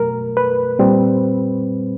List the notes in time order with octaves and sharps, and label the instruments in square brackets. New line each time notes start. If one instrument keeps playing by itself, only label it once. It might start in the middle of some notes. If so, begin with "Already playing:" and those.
Already playing: [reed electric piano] B2 F#3 A3 A#4
B4
A#2 G3 C4